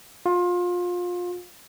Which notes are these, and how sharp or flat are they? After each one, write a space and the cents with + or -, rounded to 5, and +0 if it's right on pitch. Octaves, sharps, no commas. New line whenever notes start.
F4 +25